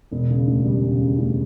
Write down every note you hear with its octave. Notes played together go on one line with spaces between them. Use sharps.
E1
C#3
D2
G3
E1
C#3
D2